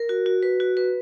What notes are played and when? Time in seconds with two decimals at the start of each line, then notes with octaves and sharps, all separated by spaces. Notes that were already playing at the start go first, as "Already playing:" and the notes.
Already playing: A#4
0.09 F#4
0.26 F#4
0.43 B4
0.60 F#4
0.77 B4